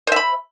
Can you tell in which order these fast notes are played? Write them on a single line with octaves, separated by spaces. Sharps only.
C5 E5 B5